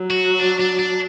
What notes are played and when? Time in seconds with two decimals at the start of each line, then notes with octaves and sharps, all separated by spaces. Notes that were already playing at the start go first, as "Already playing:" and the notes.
Already playing: F#3
0.10 F#4
0.40 D4
0.60 D4
0.79 D4